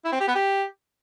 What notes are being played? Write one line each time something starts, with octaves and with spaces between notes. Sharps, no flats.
E4
C4
G4
B3
G4